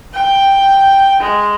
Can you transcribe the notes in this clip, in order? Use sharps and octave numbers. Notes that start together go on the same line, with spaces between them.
G5
G#3